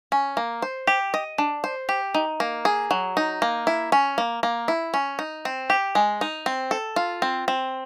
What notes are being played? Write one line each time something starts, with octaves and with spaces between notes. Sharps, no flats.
C#4
A#3
C5
G4
D#5
D4
C5
G4
D#4
A#3
G#4
F#3
D#4
A#3
E4
C#4
A#3
A#3
E4
C#4
D#4
C4
G4
G#3
D#4
C4
A4
F4
C4
C4